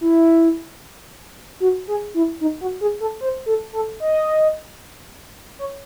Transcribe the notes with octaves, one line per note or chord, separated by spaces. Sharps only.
E4
F#4
G#4
E4
D#4
F#4
G#4
A4
C5
A4
A4
D#5
C#5